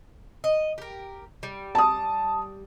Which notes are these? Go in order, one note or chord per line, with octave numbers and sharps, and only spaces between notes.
D#5
G4 A#4
G3
A5 D#6